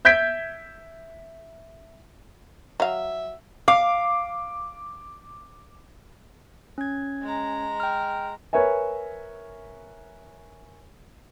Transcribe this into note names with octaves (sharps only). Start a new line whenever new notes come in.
E5 G6 G#6 B6 D7
F#3 E5 F5
F5 D6
C#4 G#6
G#3 A#5
G5 F6
A#4 B4 C#5 E5 G#5